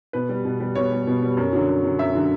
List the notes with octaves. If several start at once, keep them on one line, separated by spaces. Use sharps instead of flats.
B2 B4
G3
B2
G3
B2 C#5
G3
B2
G3
F#2
D3 F#3
F#2
D3 F#3
F#2 E5
D3 F#3